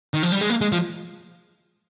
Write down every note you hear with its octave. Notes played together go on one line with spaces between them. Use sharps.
D#3
F3
G3
G#3
A#3
G#3
F3